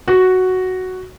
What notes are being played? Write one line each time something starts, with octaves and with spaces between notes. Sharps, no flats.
F#4